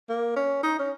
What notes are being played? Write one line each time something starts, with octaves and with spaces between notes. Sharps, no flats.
A#3
C#4
D#4
C#4